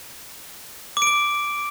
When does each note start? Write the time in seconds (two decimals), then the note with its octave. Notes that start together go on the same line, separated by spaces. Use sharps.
0.97 D6
1.02 D7
1.07 D6